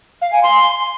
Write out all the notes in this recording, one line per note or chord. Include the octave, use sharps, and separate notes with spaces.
F5
G#5
C6